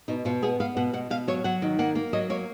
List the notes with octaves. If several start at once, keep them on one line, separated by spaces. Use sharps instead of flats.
B2 D#4
B2 F4
B3 G#4
B3 F5
B2 F#5
B2 F#5
B2 F5
F#3 C#5
F#3 F#5
D#3
A#3 F#5
A#3
F#3 D#5
A#3 C#5